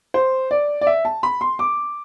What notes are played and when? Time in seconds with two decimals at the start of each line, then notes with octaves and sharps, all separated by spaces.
0.14 C5
0.51 D5
0.81 D5
0.87 E5
1.05 A5
1.23 B5
1.41 C6
1.59 D6